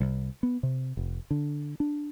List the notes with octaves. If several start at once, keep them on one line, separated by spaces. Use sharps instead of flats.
C2
B3
C3
F1
D3
D4